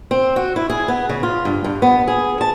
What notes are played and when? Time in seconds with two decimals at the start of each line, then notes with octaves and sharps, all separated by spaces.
0.11 C4
0.36 F#4
0.56 E4
0.70 G#4
0.88 B3
1.09 C#3
1.23 F4
1.45 G2
1.64 G2
1.82 B3
2.08 G#4
2.41 A5